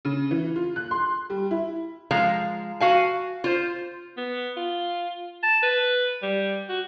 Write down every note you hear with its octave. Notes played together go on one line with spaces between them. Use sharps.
C#3
E3
F4
F#6
C6
G3
E4
F3 G#3 F5 A#5
F#4 F5 G#5
F4 C5
B3
F4
A5
B4
G3
F#4